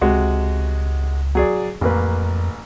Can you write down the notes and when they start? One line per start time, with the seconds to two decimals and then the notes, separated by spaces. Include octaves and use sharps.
0.01 C#2 C3 G#3 F#4
1.35 F#3 G#4 D5
1.81 A1 F2 A#3 B4